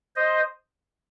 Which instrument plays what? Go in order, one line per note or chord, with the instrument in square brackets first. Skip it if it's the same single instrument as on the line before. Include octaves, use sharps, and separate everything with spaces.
[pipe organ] C5 D#5